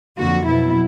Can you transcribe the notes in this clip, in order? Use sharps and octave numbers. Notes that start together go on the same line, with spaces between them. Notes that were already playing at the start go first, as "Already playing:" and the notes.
F2 D3 F#3 A#3 F#4
B2 F#3 B3 E4